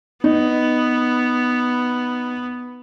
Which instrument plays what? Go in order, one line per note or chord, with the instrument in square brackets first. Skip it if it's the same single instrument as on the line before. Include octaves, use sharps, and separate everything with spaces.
[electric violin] B3 [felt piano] D#4